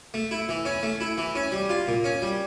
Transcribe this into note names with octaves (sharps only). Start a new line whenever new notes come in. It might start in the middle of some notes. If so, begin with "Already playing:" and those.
A3
E4
E3
C#4
A3
E4
E3
C#4
G3
F4
A#2
C#4
G3